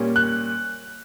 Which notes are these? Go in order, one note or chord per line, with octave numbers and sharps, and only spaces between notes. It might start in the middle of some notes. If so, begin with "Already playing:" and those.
Already playing: A#2 G3 C#4
F#6